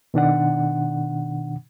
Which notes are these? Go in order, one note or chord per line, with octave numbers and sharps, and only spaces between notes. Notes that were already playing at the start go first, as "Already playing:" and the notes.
B2 D#3 D4 F#5